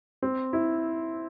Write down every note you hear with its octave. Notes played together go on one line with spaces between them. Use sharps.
C4
E4